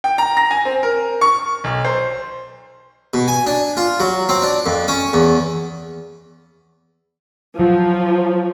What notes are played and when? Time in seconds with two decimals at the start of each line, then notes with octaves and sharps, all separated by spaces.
0.04 G5
0.18 A#5
0.37 A#6
0.51 G#5
0.65 C4
0.83 A#4
1.21 C#6
1.64 B1
1.85 C5
3.14 B2
3.28 G#5
3.47 D4
3.77 F4
4.00 F#3
4.29 C4
4.42 D4
4.66 F2
4.88 C#4
5.13 E2
7.60 F3 F#3